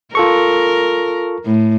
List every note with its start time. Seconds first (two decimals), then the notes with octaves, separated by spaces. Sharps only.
0.15 F4 A4 A#4 C#6
1.45 A2